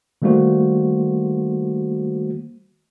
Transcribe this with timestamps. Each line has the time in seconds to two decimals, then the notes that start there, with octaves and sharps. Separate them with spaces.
0.22 D#3 G3 A3 A#3 F#4 C5